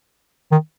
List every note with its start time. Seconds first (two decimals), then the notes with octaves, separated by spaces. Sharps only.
0.52 D#3